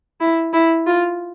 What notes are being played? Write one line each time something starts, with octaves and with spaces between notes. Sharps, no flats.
E4
E4
F4